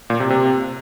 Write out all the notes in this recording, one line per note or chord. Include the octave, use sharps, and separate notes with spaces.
A#2
C3
C3